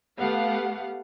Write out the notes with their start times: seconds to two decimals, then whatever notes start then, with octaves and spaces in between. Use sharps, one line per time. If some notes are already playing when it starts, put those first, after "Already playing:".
0.18 A3 B3 G4 F5 F#5